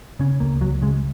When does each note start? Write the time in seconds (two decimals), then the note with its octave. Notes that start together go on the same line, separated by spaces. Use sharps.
0.19 C#3 C#4
0.40 C#2 A#3
0.61 C#2 F#3
0.82 C#3 G#3